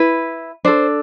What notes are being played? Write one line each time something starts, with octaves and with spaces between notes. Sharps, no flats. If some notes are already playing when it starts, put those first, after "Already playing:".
Already playing: E4 B4
D4 A4 C5